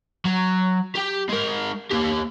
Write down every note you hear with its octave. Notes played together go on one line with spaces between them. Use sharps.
F#3
G4 G5
G#3 A#4
A#3 G4